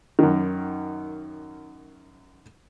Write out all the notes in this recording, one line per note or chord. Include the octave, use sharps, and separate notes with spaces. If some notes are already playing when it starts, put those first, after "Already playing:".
F#2 D#3